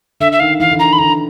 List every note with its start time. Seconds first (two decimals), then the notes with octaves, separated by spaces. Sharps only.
0.20 D3 E5
0.32 E5
0.40 D#3 F5
0.60 E3 F5
0.71 D3
0.79 D#3 A#5
0.93 B5
0.99 D3 A#5